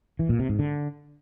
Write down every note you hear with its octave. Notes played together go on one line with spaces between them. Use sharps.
E3
A#2
C3
G#2
D3